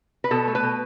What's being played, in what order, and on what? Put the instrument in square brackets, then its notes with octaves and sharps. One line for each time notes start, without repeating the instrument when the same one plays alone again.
[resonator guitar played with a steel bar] B4
B2 A4
A3
B4
B2